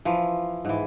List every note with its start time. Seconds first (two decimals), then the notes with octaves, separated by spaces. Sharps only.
0.05 E3 F3
0.65 G#2 E3